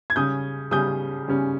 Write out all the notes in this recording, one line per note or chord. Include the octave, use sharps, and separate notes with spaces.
G#6
C#3 G3 C#4 D#6 G6
C#3 G3 C#4 D#6 G6
C#3 G3 C#4